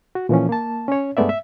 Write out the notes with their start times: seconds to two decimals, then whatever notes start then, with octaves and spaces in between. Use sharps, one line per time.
0.15 F#4
0.29 A#2 E3 F3 C#4
0.49 A#3 A5
0.88 C#4 C#5
1.17 G2 G#3 A3 B3 D5 E5
1.29 E5